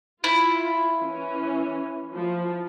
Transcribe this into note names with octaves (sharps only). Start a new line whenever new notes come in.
E4 F4
E3 C#4
F3